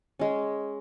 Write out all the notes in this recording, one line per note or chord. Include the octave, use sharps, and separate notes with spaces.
G#3 C#4